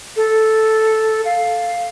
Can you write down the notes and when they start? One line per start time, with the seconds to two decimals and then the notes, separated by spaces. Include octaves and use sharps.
0.16 A4
1.25 F5